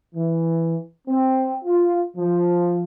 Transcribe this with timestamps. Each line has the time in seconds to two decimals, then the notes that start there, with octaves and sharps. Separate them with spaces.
0.15 E3
1.08 C4
1.65 F4
2.17 F3